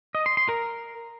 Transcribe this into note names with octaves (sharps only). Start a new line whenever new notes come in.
D#5
C6
C6
A#4